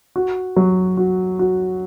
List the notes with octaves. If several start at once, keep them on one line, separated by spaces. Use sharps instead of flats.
F#4
F#3
F#4
F#4